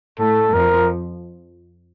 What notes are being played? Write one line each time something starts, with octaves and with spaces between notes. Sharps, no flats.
A2 A3 A4
F2 F3 A#4